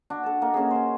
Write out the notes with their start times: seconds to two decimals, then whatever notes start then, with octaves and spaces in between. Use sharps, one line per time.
0.10 D4 F#4
0.24 A4 A5
0.42 A#3 D#4 A4
0.54 C#3 C#4 F#4 G#4
0.71 C#4 C5